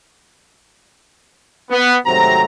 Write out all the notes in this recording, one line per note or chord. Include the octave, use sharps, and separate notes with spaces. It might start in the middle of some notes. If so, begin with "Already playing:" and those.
B3
G#1 C3 F#3 A3 C4 A#5